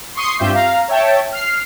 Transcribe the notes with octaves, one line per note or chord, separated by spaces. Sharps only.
C6 C#6 D#6 C7
G2 C4 F4 G4 E5 G6
F5 A#5
C#5 E5 G5 A5
F6 C7